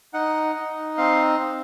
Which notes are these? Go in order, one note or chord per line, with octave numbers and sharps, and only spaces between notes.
D#4 F#5
D#4
C4 F5
C4